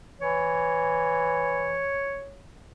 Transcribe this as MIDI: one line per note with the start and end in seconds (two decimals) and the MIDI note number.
0.21 1.89 52
0.21 2.41 73